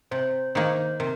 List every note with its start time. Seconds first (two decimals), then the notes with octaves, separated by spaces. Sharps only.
0.11 C3 C5
0.55 D#3 A#3 C5
1.00 C3 A#4